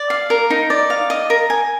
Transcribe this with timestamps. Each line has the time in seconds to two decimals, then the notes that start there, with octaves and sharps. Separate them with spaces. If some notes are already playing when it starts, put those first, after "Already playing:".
Already playing: D5
0.10 F5
0.30 A#4
0.50 D#4
0.70 D5
0.90 F5
1.10 D#5
1.30 A#4
1.50 G#5